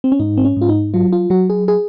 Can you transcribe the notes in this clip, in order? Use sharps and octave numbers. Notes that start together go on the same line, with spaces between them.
C4
C#4
G#2 D#4
C4
C#4
G#2 F4
D#4
F#3 F4
F4
F#3 F#4
G#4
G#4